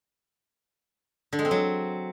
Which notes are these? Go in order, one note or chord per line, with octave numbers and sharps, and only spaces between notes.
D3
G#3
C4
F#3